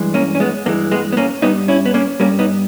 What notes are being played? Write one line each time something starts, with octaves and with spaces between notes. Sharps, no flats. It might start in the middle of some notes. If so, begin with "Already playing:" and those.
Already playing: G2 E3 G#3
A#3 C#4
C#4
G#3 B3
G2 E3 G#3 A#3
G#3 B3
B3
A#3 C#4
G2 G3 B3 D#4
C#4 E4
B3
A#3 C#4
G2 G3 A#3 C#4
B3 D#4